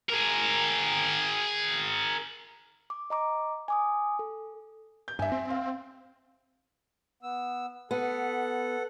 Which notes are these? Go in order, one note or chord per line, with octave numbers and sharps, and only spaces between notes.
G#4 A#4
D6
D#5 A#5 D6
G#5 D6 D#6
A4
G6
G2 E5 G#5
C4
F5
B3 E6
B3 A4 F#5